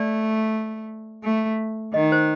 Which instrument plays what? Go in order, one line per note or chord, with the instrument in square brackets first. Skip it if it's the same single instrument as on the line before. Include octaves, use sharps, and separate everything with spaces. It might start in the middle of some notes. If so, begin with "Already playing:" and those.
Already playing: [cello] A3 [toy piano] D5
[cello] A3
[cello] D#3 [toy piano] D#5
[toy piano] C5